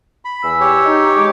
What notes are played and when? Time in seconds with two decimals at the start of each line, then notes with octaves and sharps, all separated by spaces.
0.25 B5
0.43 E2 G#5 E6
0.61 G4 C#5
0.86 D#4
1.16 G#3 D6